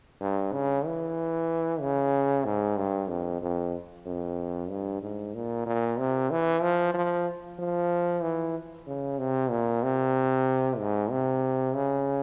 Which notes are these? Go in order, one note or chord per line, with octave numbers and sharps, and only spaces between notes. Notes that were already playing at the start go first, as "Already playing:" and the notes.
G2
C#3
E3
C#3
G#2
G2
F2
F2
F2
G2
G#2
A#2
A#2
C3
E3
F3
F3
F3
E3
C#3
C3
A#2
C3
G#2
C3
C#3